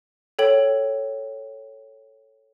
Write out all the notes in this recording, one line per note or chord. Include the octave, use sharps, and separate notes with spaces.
A4 C#5 G5 F#7